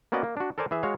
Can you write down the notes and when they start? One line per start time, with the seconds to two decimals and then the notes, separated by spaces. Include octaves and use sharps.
0.12 A#3 B3 C#4 F#4 D5 D#5
0.23 A#3
0.37 D4 F#4
0.58 A4 A#4 C5 D5 G#5 A5
0.71 E3 G#4 E5
0.83 G#3 F#4 C#5 F5